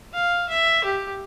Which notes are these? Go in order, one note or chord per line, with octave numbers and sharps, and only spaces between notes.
F5
E5
G4